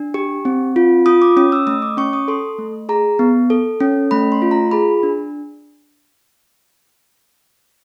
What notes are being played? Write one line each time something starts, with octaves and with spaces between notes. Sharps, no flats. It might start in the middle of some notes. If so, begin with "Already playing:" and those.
Already playing: D4
G4
C4
F4
F4 D#6
D6
C#4 D#6
E6
A3 D#6
D6
C#4 C#6
D#6
A4 C6
A3
G#4 A#5
B3
A4
C#4
A3 B5
C6
F4
A#5
G#4 B5
D4